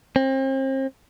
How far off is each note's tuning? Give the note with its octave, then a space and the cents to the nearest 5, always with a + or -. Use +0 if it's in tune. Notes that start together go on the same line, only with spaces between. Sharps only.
C4 +35